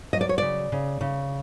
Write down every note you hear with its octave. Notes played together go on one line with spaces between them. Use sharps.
F#3 D#5
D5
C#5
C#3 D5
C#3
C#3